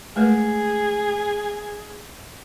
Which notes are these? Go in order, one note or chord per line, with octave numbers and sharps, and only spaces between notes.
G#3 A3 G#4 B4